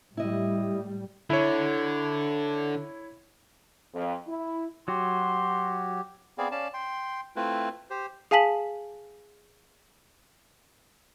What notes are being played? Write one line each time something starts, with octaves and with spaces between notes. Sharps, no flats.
A2 G3 E4 D#5
D3 E4 C#5
F2
E4
F#3 F#4 G4 C6
B3 C4 G#4 D5 F5
C#4 D5 F5 A5
G5 C6
A3 C4 E4 F4 B4
G4 C5
G#4 F5 G#5 A5 B6 F#7